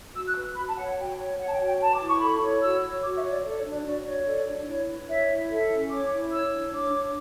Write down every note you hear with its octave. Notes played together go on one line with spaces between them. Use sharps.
F#4 E6
F#6
B4
F#4 B5
A5
C#5 F#5
F#5
F#4 G5
C#5
C#5 F#5
A5
G5
F#4
G5
B4 A5
D6
E4
C#6
A4 B5
C#5
F#4 E6
C#5
F#4 D6
E5
C#5
D5
A4
C#5
D4
D5
F#4 D5
C#5
A4 D5
D4
E4 C#5
B4
C#5 E5
E4
A4 E5
C#4
C#5 D6
E4
C#5 E6
D4
C#5 D6
D4